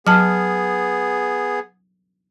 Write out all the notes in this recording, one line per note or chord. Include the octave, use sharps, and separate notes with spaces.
F#3 B3 G#4 A5 F6